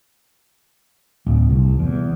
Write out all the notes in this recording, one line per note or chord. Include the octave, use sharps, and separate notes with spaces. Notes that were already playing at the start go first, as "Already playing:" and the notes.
D1
C2
E2